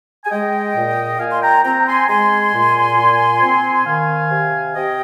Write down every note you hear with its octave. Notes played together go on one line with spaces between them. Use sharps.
G#5
G#3 D#5 G5
A#2
A#2 F5 G#5
C6
G5 A#5
C4 G5 A#5
G#5 C6
G#3 G#5 C6
A#2
A#2
C4
D#3 F5 G#5
C3
C3 D#5 G5